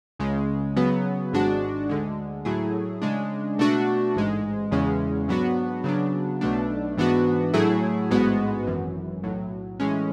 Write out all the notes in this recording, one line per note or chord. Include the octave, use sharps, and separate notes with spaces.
C#2 C#3 G#3
C#3 F#3 B3
G#1 G#2 G#3 D4 F#4
D2 D3 G#3
A2 F#3 A3 E4 G#4
C#3 G#3 D4
B2 A3 D4 F#4
A1 G#2 G#3
E2 C#3 G#3 C#4
G#2 F#3 B3 D4 F#4
C#3 F#3 B3 D4
B1 B2 A3 D4
G#2 E3 B3 D4 F#4
A2 F#3 A3 E4 G#4
A1 G#2 G#3 B3 F#4
G#1 F#2 E3
B1 A2 F#3
A2 E3 G#3 C#4